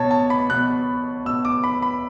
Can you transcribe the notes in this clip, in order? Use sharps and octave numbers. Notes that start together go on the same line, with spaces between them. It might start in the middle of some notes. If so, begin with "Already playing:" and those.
Already playing: B2 C#5 A5
A5
B5
B2 F#6
B2 E6
D6
B5
B5